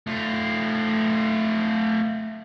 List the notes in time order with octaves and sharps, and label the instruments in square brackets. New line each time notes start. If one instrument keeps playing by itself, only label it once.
[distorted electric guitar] A3 F4